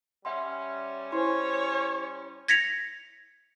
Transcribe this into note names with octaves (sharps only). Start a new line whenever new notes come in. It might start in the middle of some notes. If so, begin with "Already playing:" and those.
G3 C#4 E5 F#5 C6
E4 C5 C#5 G#5 C6
G#6 A#6 B6 C#7 F7